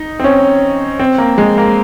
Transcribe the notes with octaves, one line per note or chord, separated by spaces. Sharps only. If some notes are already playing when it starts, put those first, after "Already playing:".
Already playing: D#4
C4
C#4
C4
A#3
G#3
A#3